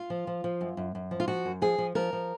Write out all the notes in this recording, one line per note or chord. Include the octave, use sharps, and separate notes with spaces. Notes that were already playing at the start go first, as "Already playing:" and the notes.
Already playing: F4
F3
F3
F3
F#2
F#2
F#2
F3
F4
F3 F#4
F#2
F3 G#4
F3
F3 A#4
F3